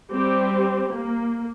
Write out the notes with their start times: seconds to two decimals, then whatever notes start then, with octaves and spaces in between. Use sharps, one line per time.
0.12 G3 C4 G4
0.92 A#3